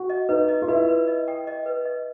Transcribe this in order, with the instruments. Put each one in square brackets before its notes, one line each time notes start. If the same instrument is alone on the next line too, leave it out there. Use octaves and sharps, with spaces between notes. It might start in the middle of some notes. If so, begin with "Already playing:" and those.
Already playing: [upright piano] F#4
[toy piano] D#5
[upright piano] D#4 [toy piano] B4
[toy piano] D#5
[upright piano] F4
[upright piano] E4 [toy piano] B4
[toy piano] B4
D#5
G5
D#5
B4
D#5